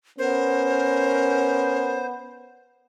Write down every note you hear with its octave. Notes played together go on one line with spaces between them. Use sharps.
B3 C#4 A#4 C5